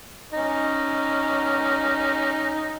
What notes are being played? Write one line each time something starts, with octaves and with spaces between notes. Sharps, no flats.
C#4 D#4